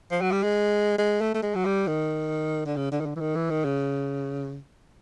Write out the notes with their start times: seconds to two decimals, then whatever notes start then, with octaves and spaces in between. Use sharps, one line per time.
0.11 F3
0.21 F#3
0.32 G3
0.43 G#3
0.98 G#3
1.21 A3
1.35 A3
1.43 G#3
1.55 F#3
1.66 G3
1.87 D#3
2.66 D3
2.76 C#3
2.92 D3
3.00 D#3
3.06 D3
3.16 E3
3.20 D#3
3.35 E3
3.50 D#3
3.65 C#3